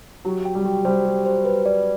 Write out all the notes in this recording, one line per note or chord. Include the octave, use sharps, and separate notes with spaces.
F#3 G4
G5
G3
G4
G3 C5
G4
C5
B4
D5